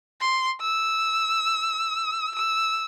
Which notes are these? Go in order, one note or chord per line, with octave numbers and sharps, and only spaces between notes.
C6
E6
E6